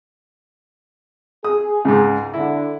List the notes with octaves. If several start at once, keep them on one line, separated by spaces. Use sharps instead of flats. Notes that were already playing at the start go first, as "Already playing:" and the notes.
G#4 D#6
C#2 G#2
D3 E4